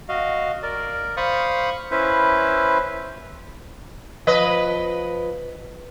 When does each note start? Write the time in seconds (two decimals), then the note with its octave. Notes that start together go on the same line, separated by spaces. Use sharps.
0.09 F#4 D#5 F5
0.63 A#4 D5
1.17 C5 F5 B5 C#6 D#6
1.91 C#4 E4 B4 C5
4.27 F3 B4 D#5